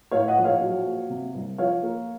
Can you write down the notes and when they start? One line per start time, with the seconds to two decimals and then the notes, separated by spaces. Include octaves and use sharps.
0.11 A2 C#5 F5
0.28 D#5 F#5
0.37 A#1
0.44 C#5 F5
0.61 F#3
0.86 A#3
1.10 C3
1.34 C2
1.58 F3 C#5 F5
1.82 A#3